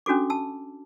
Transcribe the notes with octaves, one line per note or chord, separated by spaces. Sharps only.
C#4 D4 F#4 A4 D6
A5 E6